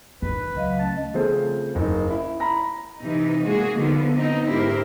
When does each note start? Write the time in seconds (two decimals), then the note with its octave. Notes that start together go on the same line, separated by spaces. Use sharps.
0.22 D#3 B4
0.55 C#2 F#3 D#5 F5
0.79 A3 C#4 D#5 A5
1.14 C#3 F3 A3 C4 C5
1.75 F#1 D#4
2.11 E4
2.40 A#5 B5 A#6
3.01 C3 E3 D#4
3.44 G#3 A#3 F#4 G#4
3.76 D3 D#3 F3 B3
4.15 B3 C4 D#4
4.49 G#2 E4 G4 A#4 C5